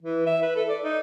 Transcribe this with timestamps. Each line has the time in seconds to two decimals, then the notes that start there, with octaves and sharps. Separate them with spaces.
0.02 E3
0.26 E5
0.42 B4
0.56 A4
0.69 D5
0.84 D#4